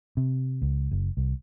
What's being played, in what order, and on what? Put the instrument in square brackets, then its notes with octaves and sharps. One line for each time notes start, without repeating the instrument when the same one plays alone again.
[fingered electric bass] C3
C#2
F#1
C2